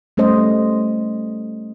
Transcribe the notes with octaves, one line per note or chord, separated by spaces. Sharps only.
G3 A3 C#4 C5 D#5